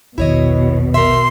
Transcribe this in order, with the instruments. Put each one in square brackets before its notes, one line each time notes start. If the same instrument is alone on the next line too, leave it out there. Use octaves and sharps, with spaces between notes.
[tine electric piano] A#1 E2 D#3 [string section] B2 [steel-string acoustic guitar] E4 C#5 D#5
[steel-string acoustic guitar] A#4 E5 [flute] C6